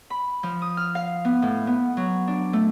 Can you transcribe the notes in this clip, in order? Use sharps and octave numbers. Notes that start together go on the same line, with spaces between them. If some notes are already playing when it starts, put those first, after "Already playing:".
B5
F3
D#6
F6
F5
B3
A2
B3
F#3
D4
A3